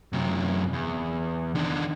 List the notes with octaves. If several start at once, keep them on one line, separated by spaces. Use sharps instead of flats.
F#2 C3
E2
D#3 D4